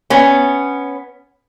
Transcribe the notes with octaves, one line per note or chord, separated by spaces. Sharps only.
B3 C#4